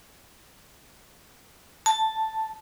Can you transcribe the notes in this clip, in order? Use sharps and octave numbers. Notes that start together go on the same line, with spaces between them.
A5